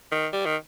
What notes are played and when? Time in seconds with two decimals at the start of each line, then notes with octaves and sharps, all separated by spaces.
0.11 D#3
0.33 G3
0.46 D#3